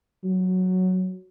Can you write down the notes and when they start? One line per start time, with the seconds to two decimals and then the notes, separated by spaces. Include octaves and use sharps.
0.24 F#3